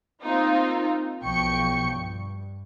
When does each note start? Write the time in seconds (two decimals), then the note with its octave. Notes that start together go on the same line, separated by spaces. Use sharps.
0.22 A#3 C4 D#4 F4
1.22 B1 F3 G5 C#6 C#7
1.90 G2